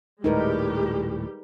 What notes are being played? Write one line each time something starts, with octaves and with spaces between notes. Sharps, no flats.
D#1 A2 G3 G#3 D#4 G4 A#4 B4